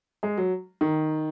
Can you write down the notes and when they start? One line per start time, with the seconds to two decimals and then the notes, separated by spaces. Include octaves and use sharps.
0.23 G#3
0.37 F#3
0.81 D#3